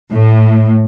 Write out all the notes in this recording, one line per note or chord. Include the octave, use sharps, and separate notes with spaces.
A2